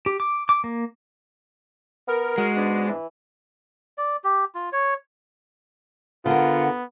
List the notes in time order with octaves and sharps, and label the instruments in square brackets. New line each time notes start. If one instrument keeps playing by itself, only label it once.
[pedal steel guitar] G4
D6
D6
A#3
[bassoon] B3 [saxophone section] A#4
[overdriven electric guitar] G#3 [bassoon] F#4
[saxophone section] G#2 B3 D4
[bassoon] E3
[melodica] D5
G4
F4
C#5
[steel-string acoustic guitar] D3 A#4 [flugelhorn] B3 [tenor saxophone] F4 [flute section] F#5